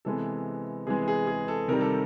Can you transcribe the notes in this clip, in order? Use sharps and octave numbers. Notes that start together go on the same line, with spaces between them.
C3 E3 G#3 B3 A4
C3 E3 G#3 B3 G#4
G#4
G#4
A4
C3 D#3 G3 A#4
A4